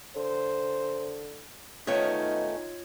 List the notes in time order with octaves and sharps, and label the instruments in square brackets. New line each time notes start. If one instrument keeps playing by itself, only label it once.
[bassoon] D3 [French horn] C5
[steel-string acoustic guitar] D#3 A3 C#4 [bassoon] B3 [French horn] D#4 [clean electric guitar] F4 C#5 D#5